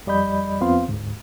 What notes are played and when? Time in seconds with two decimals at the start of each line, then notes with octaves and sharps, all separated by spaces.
0.07 F2 G3 D5 D#5 B5 G6
0.61 F2 B3 C4 F4 F5 C6
0.88 D2 G#2